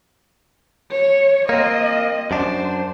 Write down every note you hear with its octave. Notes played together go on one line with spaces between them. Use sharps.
C#5
A#3 C4 D#5
F#2 D4 C5